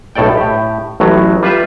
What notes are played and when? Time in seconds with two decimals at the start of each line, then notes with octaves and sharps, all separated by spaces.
0.15 B1 A2 A4 D5 G5
0.37 A2 G4
1.00 A1 A2 F#3
1.43 G3 F4 B4 E5